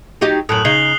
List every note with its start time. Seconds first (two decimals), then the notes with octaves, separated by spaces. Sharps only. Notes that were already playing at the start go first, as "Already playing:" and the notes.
0.21 F#3 D#4 G4
0.49 F#2 A2 D#6 F#6 F#7
0.65 C#3 D#4 C7 F7 G7